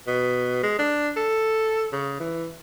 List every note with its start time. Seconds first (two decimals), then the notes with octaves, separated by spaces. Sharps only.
0.07 B2
0.63 G#3
0.79 D4
1.17 A4
1.92 C#3
2.20 E3